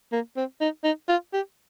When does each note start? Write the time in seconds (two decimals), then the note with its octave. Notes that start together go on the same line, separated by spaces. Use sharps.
0.12 A#3
0.36 C4
0.61 D#4
0.84 D#4
1.08 F4
1.33 G4